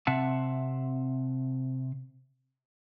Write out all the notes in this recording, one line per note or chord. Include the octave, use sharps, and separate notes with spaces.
C3 C4 E5 F#5 A5